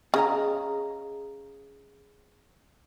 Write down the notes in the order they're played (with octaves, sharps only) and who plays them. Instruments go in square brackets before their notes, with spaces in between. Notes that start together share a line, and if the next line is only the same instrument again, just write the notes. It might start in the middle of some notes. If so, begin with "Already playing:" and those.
[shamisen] C#3 [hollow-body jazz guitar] G#4 D#5 A#5